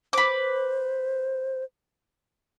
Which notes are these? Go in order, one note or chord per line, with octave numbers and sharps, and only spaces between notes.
B4 C5 D6